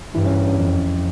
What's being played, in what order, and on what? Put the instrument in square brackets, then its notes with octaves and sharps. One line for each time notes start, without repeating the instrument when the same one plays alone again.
[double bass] G2 [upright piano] E3
[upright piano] C#4
C#4
[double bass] F2